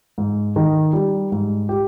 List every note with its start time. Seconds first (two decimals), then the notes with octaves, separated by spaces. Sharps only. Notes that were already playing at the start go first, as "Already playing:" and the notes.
0.18 G#2
0.56 D#3
0.93 G3
1.32 G#2
1.69 G4